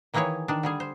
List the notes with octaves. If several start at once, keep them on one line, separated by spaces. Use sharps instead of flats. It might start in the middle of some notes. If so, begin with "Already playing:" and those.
D#3 E3 A#3 E4 G#4 C#5
D#3 D4
D3 G3 G#4
C5